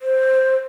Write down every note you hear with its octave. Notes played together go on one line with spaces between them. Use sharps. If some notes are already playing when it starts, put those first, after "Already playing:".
C5